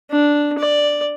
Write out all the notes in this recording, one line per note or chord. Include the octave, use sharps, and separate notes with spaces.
D4
D5